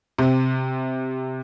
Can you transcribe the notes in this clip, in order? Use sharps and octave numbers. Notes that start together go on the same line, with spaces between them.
C3